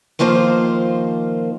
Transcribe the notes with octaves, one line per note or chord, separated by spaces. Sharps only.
D#3 F3 A#3 F4 C5